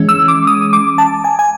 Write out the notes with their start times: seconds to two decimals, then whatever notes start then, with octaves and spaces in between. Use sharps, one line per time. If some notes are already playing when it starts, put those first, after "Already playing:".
Already playing: E3 G#3 C#4
0.09 E6
0.28 D6
0.47 D#6
0.73 D6
0.98 A5
1.24 G#5
1.39 G#5